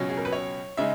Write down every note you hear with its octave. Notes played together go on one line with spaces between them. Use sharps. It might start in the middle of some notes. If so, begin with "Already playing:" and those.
Already playing: C#2 B2 F#3 C#4
G#4
A#4
B4
C#5
C#3 G#3 D#4 E5